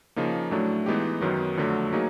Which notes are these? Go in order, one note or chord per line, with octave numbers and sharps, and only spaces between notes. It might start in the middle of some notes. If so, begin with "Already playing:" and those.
C#3 F3 A#3 D#4
A2 F#3 A3 D4
E3 G#3 B3 D#4 G4
F#2 D#3 F#3 B3
F2 D3 F#3 A3
F#3 A#3 D#4 G#4